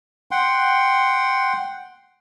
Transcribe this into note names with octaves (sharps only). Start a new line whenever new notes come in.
F#5 G5 C6